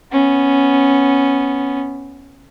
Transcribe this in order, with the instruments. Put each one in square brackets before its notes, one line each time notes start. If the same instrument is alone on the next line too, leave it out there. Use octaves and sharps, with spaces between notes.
[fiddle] B3 C#4